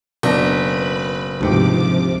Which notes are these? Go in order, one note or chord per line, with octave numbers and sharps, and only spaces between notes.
F#1 B2 D4 B4 B5
D2 G#2 C3 F3 G4 D6